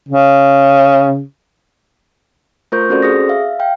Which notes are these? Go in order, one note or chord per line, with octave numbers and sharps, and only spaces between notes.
C#3
A3 F4 A#4 C5 C#6 G6
C4 C#4 F#4 A4 C5 D5
G#4 D#6 A#6
E5 F5
F5 G5